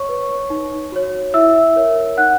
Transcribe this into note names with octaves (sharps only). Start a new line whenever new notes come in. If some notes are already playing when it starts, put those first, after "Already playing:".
Already playing: C#5 C#6
B4
D#4
F#4 C#5
E4 E5 E6
A#4 C#5
D#4 F#5 F#6